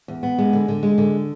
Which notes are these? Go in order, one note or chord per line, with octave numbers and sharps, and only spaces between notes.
E2
B3
G#3
D3
D3
G#3
D3